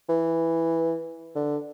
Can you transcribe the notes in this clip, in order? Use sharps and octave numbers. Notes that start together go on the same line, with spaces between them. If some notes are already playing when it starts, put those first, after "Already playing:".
E3
D3